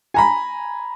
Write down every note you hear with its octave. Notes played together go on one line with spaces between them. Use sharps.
G#5 A#5 B5